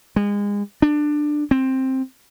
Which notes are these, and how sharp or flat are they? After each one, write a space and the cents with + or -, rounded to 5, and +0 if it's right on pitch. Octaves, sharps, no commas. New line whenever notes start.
G#3 -30
D4 +15
C4 +10